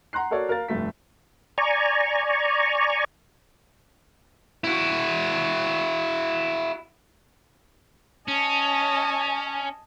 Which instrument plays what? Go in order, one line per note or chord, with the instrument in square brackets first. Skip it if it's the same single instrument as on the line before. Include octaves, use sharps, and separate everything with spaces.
[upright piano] F#5 A#5 C6 F#6 C7
F#4 A4 A#4 C#5 D5
A#4 F5 A6
F1 G2 A3 B6
[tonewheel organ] D5 G#5 A#5 C#6
[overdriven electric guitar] E4 F#4
[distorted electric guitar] C#4 [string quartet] D#5 G#5 A5